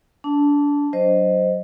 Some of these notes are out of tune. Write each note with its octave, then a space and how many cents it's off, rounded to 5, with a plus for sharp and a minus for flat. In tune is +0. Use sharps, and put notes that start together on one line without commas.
D4 -30 A5 -5
F#3 +0 C5 +0 D#5 +0